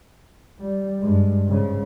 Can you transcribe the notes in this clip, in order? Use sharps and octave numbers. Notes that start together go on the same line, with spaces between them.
G3
G2 G#3
G#2 C#3